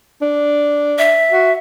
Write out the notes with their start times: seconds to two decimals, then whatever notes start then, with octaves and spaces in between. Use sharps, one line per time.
0.22 D4
0.98 E5
1.32 F#4